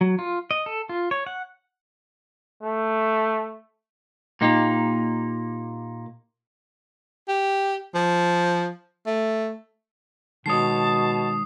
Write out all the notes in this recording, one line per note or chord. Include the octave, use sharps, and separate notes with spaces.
F#3
F4
D#5
A4
F4
C#5
F#5
A3
A#2 A#3 D#4 G4
G4
F3
A3
B2 D#3 G#3 C#5 A5 D#6 C7